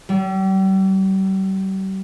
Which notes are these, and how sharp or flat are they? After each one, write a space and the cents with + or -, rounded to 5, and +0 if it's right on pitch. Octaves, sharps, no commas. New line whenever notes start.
G3 -40